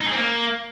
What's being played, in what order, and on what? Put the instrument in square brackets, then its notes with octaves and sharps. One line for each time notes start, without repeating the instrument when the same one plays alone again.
[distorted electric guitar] D#4
G#4
C4
A#3